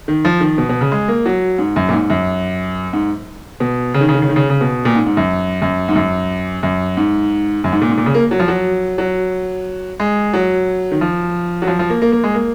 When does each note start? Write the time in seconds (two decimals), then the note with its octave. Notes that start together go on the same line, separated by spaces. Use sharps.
0.08 D#3
0.25 F3
0.41 D#3
0.58 B2
0.69 B2
0.81 C#3
0.92 G#3
1.08 A#3
1.26 F#3
1.58 G#2
1.76 F#2
1.89 A#2
1.93 G#2
2.10 F#2
2.93 G#2
3.60 B2
3.94 C#3
4.01 D#3
4.09 C#3
4.15 D#3
4.22 C#3
4.29 D#3
4.36 C#3
4.50 C#3
4.61 B2
4.85 A#2
4.95 G#2
5.06 G#2
5.17 F#2
5.62 F#2
5.89 G#2
5.96 F#2
6.63 F#2
6.97 G#2
7.64 F#2
7.72 G#2
7.81 A#2
7.90 G#2
7.97 A#2
8.06 C#3
8.15 A#3
8.31 F#3
8.40 F3
8.48 F#3
8.98 F#3
10.00 G#3
10.34 F#3
10.92 D#3
11.01 F3
11.62 F#3
11.67 F3
11.79 F3
11.90 A#3
12.02 A#3
12.12 A#3
12.24 G#3
12.35 A#3